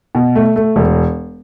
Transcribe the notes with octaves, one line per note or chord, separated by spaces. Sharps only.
B2
A3
A3
E1